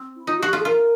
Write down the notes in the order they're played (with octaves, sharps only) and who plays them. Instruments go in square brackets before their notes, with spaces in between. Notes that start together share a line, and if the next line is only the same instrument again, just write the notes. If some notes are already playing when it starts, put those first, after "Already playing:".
Already playing: [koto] C4
[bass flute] E4
[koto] D#4 [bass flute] F4
[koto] F#4 [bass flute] G4
[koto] F4 [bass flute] G#4
[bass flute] A4
[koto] F4 [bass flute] A#4